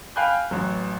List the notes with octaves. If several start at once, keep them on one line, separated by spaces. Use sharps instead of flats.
F5 G5 G#5 B5 F#6 G6
A1 E3 F#3